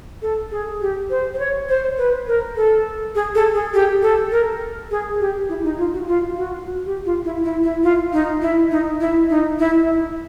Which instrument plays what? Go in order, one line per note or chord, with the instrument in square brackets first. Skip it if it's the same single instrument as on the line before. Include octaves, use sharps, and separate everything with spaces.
[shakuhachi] A4
G#4
G4
C5
C5
C#5
C5
B4
A#4
A4
G#4
A4
G#4
G4
A4
A#4
G#4
G4
E4
D#4
F4
F#4
F4
F#4
G4
F4
E4
E4
E4
F4
D#4
E4
D#4
E4
D#4
E4